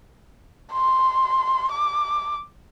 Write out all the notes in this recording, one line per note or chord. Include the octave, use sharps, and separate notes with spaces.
C6
D6